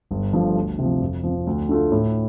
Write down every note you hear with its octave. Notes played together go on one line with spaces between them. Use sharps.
G1
G2 F3 A3
D2
C3 F3
F2
F3 C4
D2
D3 A3 F4
A2